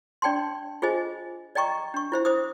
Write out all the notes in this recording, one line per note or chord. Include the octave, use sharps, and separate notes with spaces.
D4 D5 G5 A5 C6
F4 G#4 C5 D#5 G#5
D5 D#5 G5 A#5 C#6 D6
D4 C#6
E4 C5 E5
C5 E5 D6 D#6